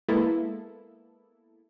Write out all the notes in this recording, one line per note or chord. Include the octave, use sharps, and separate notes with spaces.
G#3 A#3 B3 E4 A4